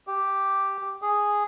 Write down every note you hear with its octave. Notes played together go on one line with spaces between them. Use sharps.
G4
G#4